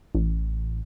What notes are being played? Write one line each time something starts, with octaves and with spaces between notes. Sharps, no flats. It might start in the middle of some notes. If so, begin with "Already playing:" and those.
A1